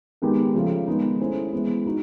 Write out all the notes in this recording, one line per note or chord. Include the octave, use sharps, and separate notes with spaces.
D#3 G#3 B3 D#4 G4
C#3 F3 A3
D#3 G#3 B3 D#4
A3 C#4 E4 G#4 C5
E3 G#3 B3
D#4 F#4